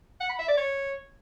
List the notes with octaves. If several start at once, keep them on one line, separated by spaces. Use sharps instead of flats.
F#5
B5
E5
D5
C#5